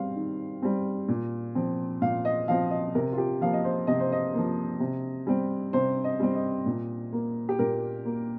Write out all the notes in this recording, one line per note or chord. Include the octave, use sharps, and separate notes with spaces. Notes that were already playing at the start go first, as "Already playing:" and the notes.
Already playing: G3 C4 F5
D#3
G3 C4
A#2
F3 C4
A#2 F5
D#5
F3 C4 F5
D#5
C3 A#4
F4
G4
F3 A#3 F5
D#5
C5
C3 D#5
C5
D#5
F3 A#3
C3
G3 C4
C3 C5
D#5
G3 C4
D#5
A#2
A#3
G4
A#2 A#4
A#3